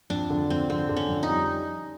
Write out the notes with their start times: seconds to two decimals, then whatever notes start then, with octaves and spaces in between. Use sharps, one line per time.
0.10 F2 D4
0.30 D3
0.50 F2 C4
0.70 D3 C4
0.89 D3
0.97 C#4
1.09 F2
1.23 D#4
1.29 G3